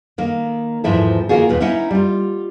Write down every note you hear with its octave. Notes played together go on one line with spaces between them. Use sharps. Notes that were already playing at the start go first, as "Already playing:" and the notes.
D#3 A#3
E2 G#2 D#3 F3 E4 A4
D#3 A#3 C4 F4 F#4 G#4
D#2 A#2 B3
C#4 D#4 E4 F#5
G3 F4